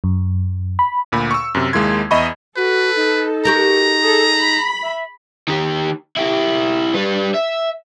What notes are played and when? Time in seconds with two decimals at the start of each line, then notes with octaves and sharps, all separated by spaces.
0.04 F#2
0.79 B5
1.12 D2 A#2 B5
1.31 C#6 E6
1.55 F#2 C3
1.73 D#2 G#3 A#3 E4 C6 G#6
2.11 E2 D#5 E5 B5 C#6
2.57 F#4 A4 B4
2.96 D#4
3.45 F#4 G4 A#4 A#5
4.03 G#4 A4
4.35 B5
4.83 E5
5.48 D#3 G4
6.17 E4 G4
6.94 G3 B4
7.34 E5